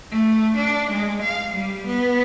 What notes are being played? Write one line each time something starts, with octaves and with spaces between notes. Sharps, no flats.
A3
D4
G#3
F5
G3
B3